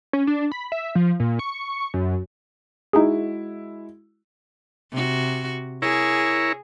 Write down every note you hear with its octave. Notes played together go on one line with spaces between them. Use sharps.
C#4
D4
B5
E5
F3
A#2
C#6
F#2
G#3 D#4 E4 F#4 G#4
C3 F#4
E4 G#4 A#4 C#5